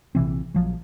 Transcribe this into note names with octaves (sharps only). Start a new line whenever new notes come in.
A#1 C3 E3 C4
A#1 F3 F#3